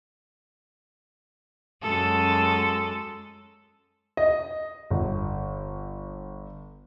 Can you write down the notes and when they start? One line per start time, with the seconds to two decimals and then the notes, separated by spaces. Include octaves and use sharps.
1.83 F#2 G#3 A4
4.17 D#5
4.91 G1